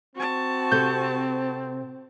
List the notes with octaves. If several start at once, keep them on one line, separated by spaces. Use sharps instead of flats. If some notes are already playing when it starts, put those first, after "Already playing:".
C4 F#4 A5
C3 G4 A4 G6